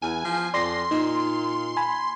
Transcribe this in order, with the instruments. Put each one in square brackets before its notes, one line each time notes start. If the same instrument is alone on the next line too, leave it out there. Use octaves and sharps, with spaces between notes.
[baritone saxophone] E2 [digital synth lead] G#5
[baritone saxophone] F3
[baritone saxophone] F2 [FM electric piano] D5 A#6 C7 [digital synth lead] C6
[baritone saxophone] A#2 [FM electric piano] D#4
[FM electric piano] G#5 B5